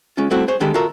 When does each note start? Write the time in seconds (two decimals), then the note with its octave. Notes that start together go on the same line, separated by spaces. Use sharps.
0.17 G#3 C#4 F4
0.31 G3 A3 C4 E4 F#4 A4
0.48 G#4 C5 C#5
0.60 D3 D#3 G#3 G4 A4 B5
0.74 F4 F#4 A4 A#4 E5